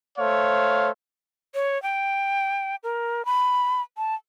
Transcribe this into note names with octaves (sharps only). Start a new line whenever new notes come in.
A3 C5 C#5 F5
C#5
G5
A#4
B5
A5